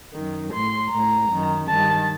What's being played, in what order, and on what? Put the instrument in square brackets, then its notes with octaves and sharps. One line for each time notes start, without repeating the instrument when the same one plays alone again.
[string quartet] F#2 D#3
A2 C6
A2 A#5
F#2 D#3
G2 D#3 A5